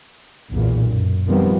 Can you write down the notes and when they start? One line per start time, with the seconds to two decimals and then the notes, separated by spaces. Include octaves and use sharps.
0.51 B1 E2 A#2
0.87 F#2
1.27 B2 D#3 F3 G3 B3 C4